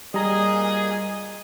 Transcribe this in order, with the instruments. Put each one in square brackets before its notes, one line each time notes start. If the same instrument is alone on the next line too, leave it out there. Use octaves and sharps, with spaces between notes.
[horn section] A#2 G#4 [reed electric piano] G3 A#5 [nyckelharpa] D#5